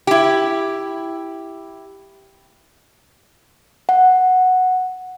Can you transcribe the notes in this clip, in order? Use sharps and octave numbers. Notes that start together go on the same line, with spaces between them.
E4 G4
F#5